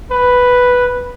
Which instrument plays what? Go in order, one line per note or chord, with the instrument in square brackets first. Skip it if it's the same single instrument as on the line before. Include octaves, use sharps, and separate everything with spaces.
[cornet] B4